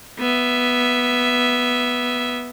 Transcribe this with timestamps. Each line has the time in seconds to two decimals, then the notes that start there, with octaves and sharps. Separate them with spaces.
0.19 B3 E5